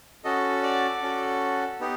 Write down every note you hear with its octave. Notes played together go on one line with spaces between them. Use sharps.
C#4 F#4 A4 D#5
D5
C#4 F#4 A4
B3 D#4 G4